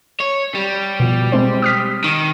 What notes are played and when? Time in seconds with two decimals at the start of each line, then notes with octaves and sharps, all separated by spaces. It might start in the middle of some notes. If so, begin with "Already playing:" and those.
0.20 C#5
0.54 G3
1.00 B2 F3
1.32 G#3 C4 C5
1.62 D#6 F6 B6
2.04 D#3